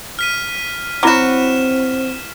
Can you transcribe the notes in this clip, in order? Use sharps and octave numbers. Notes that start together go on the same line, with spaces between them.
F6 B6 D#7
F#3 C4 E4 F#4 B5 D6 F6 E7